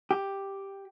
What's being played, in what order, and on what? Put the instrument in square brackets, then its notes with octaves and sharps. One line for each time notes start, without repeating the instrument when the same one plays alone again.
[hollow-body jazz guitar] G4